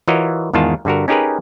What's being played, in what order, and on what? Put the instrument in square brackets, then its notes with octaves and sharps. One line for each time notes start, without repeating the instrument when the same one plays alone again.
[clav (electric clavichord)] E3 F4 F#4 A#4 C#5 D#5
E2 G#2 D#3 F4 A5
G2 D3 F#4 A#4
C#4 D#4 G4 G#4 A#4 B4